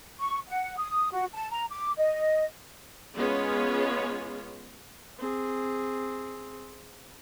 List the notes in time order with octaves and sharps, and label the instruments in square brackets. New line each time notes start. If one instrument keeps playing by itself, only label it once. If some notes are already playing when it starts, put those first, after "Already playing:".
[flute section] C#6
F#5
D#6
F#4
A5
A#5
D6
D#5
[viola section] G#3 B3 C#4 F4 G#4 C#5
[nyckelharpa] C4 G#4